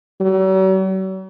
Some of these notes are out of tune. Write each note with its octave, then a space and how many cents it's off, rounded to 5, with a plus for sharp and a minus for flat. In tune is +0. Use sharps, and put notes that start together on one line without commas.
F#3 +45